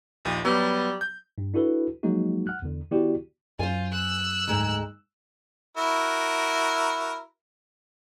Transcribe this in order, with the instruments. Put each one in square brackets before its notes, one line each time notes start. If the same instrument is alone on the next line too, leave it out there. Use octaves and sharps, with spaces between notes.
[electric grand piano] A#1 D#2 F3
[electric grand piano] F#3 B3 [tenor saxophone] G3
[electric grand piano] G6
[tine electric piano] G2
D4 E4 F#4 A4 B4
F3 F#3 G#3 A#3 D#4 F#4
F#5 F6 F#6
E2 D3
D#3 B3 E4 F#4 G4 D5
[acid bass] F#2 [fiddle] F4 [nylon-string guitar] C5 G#5
[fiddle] E6 F#6
[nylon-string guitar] D2 G#2 G#3
[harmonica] E4 F#4 A#4